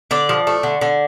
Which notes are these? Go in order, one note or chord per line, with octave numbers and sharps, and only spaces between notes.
D3 D5
F3
A3
D3
D3